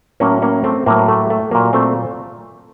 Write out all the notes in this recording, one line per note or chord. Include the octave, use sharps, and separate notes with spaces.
A2 F#3 A#3 C#4
A#3 C#4
A3 C4
A2 F#3 A#3
A3
A3
A#2 F#3 A#3
A3 C4